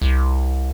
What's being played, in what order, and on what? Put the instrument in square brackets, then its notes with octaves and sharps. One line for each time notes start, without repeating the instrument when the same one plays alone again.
[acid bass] C2